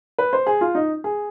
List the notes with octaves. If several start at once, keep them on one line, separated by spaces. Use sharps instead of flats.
B4
C5
G#4
F4
D#4
G#4